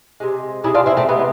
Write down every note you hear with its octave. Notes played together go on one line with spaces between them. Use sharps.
C3 G#3
C3 G#3 E4 G#4
D4 F4
C4 E4
A3 C4
C3 G#3 B3